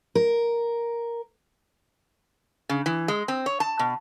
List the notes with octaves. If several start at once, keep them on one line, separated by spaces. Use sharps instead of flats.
A#4
C#3
E3
G#3
C4
C#5
A5
B2